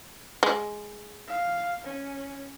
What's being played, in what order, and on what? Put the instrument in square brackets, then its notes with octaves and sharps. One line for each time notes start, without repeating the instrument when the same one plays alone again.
[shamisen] G#3
[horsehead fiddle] F5
C#4